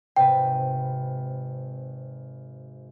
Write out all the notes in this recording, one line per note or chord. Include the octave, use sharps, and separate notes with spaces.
G#1 C3 B4 G5